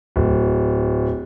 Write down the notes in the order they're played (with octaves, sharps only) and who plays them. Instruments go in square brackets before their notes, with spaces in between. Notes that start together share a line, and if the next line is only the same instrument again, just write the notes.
[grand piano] D1